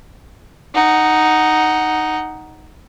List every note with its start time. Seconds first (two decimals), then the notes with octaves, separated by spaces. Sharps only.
0.74 D#4 F#5